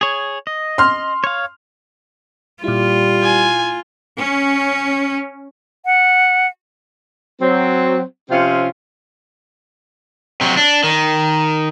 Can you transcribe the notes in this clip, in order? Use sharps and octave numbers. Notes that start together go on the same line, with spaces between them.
G#4 C#5
D#5
C6 F6
C#5 F5
A#2 G3 E4 F4
G#5
C#4
F#5
F#3 C4
C3 F3 C4 C#4 F4
C3 F#3
D4
D#3